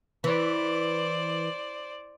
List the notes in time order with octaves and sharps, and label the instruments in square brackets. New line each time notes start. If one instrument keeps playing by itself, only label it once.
[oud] E3 [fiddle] C5 D5